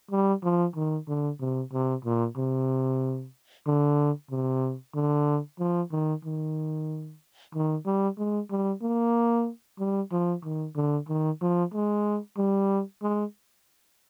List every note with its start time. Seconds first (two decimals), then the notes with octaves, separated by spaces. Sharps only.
0.11 G3
0.44 F3
0.76 D#3
1.08 D3
1.40 C3
1.73 C3
2.05 A#2
2.37 C3
3.66 D3
4.31 C3
4.95 D3
5.59 F3
5.92 D#3
6.25 D#3
7.54 D#3
7.86 G3
8.18 G#3
8.50 G3
8.82 A#3
9.79 G3
10.12 F3
10.44 D#3
10.76 D3
11.08 D#3
11.41 F3
11.74 G#3
12.37 G3
13.02 G#3